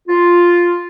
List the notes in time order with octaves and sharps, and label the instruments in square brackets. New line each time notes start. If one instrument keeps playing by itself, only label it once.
[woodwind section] F4